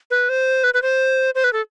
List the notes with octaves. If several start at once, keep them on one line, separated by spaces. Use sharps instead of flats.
B4
C5
B4
B4
C5
C5
B4
A4